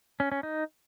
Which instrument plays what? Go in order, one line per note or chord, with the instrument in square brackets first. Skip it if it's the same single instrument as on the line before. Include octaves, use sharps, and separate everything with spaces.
[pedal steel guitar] C#4
C#4
D#4